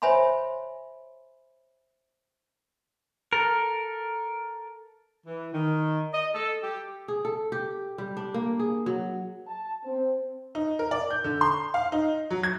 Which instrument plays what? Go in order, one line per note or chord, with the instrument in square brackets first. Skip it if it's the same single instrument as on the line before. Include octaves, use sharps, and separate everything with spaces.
[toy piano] C5 C#5 E5 G#5 B5 C6
[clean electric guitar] A4 A#4
[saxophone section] E3
D#3
D#5
A4
G4
[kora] G#4
A4
G4
G3
D4
A#3
G#4
F#3
[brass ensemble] A5
C4
[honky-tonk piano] D#4
A#4
D5
G6
D3
C6
F5
D#4
F#3
G#6